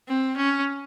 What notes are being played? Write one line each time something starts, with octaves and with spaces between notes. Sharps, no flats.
C4
C#4